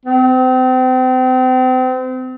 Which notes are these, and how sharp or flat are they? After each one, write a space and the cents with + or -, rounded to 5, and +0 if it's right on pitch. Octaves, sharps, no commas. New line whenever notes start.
C4 -35